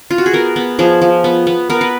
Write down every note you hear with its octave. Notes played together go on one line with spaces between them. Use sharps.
F4
F#4
G#4
B3 A#4
B3
F3 G#4
F3
B3
B3
B3 A#4
B4